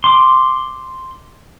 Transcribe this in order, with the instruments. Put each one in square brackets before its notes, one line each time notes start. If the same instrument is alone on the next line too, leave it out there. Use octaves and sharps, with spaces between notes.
[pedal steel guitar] C6 D6